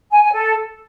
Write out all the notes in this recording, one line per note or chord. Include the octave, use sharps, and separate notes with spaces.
G#5
G#5
A4